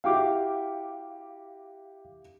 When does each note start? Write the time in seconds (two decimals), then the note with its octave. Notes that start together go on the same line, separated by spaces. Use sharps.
0.04 E4 F#4 G4 F5 G5 D6